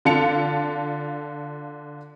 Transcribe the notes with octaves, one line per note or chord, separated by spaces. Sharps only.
D3 F4 A5 C#7 F7